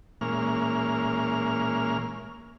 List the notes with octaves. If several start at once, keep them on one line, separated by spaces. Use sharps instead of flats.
A#2 E3 G#3 A#3 C#4 F6